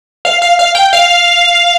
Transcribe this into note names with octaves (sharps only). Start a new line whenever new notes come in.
F5
F5
F5
G5
F5